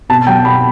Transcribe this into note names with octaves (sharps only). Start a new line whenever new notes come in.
B2 A5
F#3 G5
B2 B5